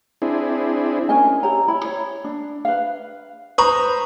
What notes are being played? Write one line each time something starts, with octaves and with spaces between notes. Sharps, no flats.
C4 D4 E4 G#4
C#4 A#4 D#5 G#5
E4 G4 C#5 A#5
E4 C#5 B5
C#5
D4
B4 F5
B4 C5 A#5 C#6 D#6